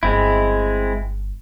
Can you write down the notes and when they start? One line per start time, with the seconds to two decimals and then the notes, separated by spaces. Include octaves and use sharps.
0.03 G1 G#3 C4 E4